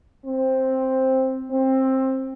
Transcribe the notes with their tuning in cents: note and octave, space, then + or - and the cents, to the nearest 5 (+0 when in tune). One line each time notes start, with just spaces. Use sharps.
C4 +5
C4 +15